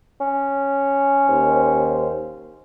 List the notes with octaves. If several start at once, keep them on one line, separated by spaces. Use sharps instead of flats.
C#4
D#2 C5